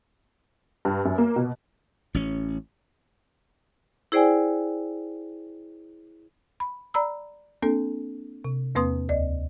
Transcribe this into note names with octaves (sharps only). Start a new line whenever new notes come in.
G2
F#2
A#3
B2
A1 C#4
E4 G#4 C5 D5 G5 G#5
B5
D5 A#5 B5 E6
A#3 C4 D4 A4
C3
E2 A#3 C4 B4 C6 D#6
D2 D5 D#5